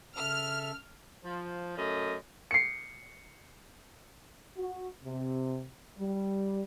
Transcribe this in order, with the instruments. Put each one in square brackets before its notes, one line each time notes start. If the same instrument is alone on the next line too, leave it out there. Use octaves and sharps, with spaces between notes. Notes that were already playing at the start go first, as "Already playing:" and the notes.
[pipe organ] C#3 A4 E5 [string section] F6
[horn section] F3
F#2 A3 C#4 D#5
[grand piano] C7 C#7
[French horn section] F#4
C3
G3